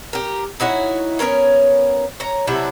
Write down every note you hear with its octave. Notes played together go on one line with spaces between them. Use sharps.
G4 A#4
D#4 E4 F#4 C#5
B3 C#4 A#4 C#5
C#5 A#5
C3 F#3 D4 E4